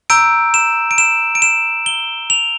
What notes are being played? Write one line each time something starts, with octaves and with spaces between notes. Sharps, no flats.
A#5 E6 G6 D7
E7
D7
E7
D7
E7
G7
F7